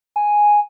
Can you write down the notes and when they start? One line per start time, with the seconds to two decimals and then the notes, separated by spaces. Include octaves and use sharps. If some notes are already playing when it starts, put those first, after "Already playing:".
0.16 G#5